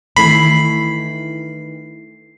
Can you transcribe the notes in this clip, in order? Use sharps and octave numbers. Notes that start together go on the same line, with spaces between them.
D#3 E3 A3 E4 B5 C7